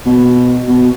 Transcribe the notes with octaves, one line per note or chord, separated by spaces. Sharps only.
B2
B2